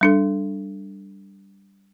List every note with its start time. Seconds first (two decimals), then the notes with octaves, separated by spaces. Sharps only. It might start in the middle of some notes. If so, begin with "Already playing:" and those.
0.01 G3 D4 A4